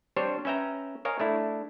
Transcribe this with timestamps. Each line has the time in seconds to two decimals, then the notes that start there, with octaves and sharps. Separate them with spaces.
0.16 G3 C4 D4 C5 C#5
0.45 C#4 B4 E5 G5 A#5
1.05 A#4 C#5 D#5 F5 G#5 A#5
1.20 A3 D4 E4